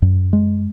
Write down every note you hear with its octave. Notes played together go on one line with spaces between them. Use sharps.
F#2
G#3